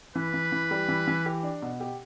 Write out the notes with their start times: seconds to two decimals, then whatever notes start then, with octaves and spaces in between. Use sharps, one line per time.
0.15 E3 B4
0.34 E3
0.52 E3
0.71 G3
0.89 E3
1.07 E3
1.26 G4
1.43 D4
1.62 B2
1.80 G4